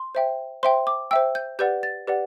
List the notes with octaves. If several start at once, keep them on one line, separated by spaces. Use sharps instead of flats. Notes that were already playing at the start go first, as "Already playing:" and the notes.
Already playing: C6
C5 E5 G5
C5 E5 G5 C6
D6
C5 E5 G5 E6
G6
G4 B4 D5 F#5 G6
A6
G4 B4 D5 F#5